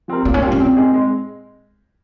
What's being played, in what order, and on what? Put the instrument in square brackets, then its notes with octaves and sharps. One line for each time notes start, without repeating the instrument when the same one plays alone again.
[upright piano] F3 C4 G4 A#4
[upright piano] A#2 [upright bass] A#3
[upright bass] C#4
[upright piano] G3 A#3 F4 [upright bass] C4
[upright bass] C#4
[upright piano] A#2 [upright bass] C4
[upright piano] G#3 D#4 G#4
G#3